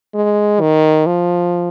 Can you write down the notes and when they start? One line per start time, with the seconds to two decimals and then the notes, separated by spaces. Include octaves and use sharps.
0.15 G#3
0.61 D#3
1.07 F3